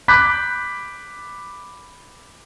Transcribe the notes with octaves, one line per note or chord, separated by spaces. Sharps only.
B5 D6 F#6 G6 B6